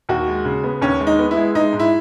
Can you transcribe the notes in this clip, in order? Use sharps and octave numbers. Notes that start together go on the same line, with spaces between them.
D#2 F#4
G#3
C#3
B3
D#2 C#4
G#3
D#4
B3
E4
G#3
G#3 D#4
G#2
E4